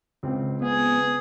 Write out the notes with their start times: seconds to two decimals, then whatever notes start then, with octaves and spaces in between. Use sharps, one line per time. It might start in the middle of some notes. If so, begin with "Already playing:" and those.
0.23 C#2 C4
0.62 B3 G#4 B4